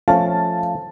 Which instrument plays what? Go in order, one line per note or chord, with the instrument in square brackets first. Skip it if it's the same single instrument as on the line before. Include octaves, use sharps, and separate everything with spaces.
[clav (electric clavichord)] F3 A3 C#4 [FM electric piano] F5 [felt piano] A5